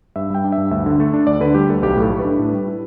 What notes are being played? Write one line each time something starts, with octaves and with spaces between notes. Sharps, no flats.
G2 E5
G3 G5
D4
E5
G2
D2 E5
D3
A3 A4
D4
D2 D5
D3 B4
G3 G4
D2 A4
B1 G4
A2
A4
A3
B4
D4
A2
G3
E4